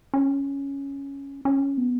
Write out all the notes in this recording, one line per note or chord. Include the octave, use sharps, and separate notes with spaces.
C#4
C#4
B3